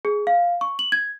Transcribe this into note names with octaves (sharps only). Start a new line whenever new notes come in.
G#4
F5
C#6
F#7
G#6